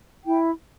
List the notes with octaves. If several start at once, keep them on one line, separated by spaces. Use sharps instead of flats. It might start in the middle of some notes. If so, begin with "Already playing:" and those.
E4 G5